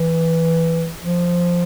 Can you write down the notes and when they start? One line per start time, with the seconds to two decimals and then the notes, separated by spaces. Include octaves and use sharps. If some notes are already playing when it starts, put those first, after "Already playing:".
Already playing: E3
1.02 F3